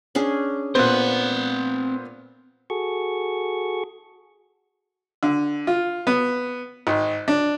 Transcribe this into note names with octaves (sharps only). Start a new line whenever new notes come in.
C#4 D4 G#4
A#2 B3 C4 C5 F#5 F#6
F#4 G#4 A4 C#6
D3
F4
B3
G#1
D4